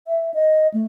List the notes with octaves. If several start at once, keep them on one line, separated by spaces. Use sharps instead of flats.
E5
D#5
A3